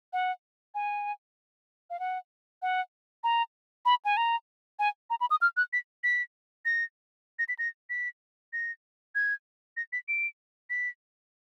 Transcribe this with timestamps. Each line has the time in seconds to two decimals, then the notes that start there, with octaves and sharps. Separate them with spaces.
0.13 F#5
0.75 G#5
1.90 F5
2.00 F#5
2.62 F#5
3.24 A#5
3.85 B5
4.05 G#5
4.17 A#5
4.79 G#5
5.10 A#5
5.21 B5
5.31 D#6
5.41 F6
5.57 F#6
5.73 B6
6.04 B6
6.65 A#6
7.39 A#6
7.49 B6
7.59 A#6
7.90 B6
8.53 A#6
9.15 G#6
9.77 A#6
9.93 B6
10.08 D7
10.70 B6